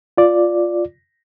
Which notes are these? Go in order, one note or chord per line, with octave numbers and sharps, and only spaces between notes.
F4 D5